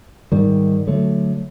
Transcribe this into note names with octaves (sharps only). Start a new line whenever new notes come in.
G#2 D#3 G3
D3 F#3 A3